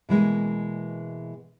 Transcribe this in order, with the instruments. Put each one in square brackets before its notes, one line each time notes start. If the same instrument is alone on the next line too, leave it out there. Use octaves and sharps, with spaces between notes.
[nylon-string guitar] B2 E3 G#3 A#3